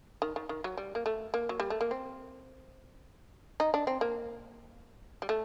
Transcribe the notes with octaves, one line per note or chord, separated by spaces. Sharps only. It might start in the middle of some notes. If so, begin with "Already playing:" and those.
D#3
D#3
D#3
F#3
G3
A#3
A3
A#3
F#3
G3
A3
A#3
C4
D#4
D4
C4
A#3
G3
A3